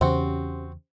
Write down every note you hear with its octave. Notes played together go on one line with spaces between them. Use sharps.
E2 C#3 E3 C4 C#4 F#4 G4 C5